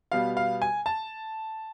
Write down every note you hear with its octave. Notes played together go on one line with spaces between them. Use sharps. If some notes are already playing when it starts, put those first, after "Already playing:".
B2 G3 B3 F5
F5
G#5
A5